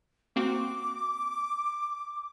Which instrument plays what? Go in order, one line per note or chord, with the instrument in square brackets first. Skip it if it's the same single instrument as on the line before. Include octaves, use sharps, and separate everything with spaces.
[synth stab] A#3 C4 F#4 [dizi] D6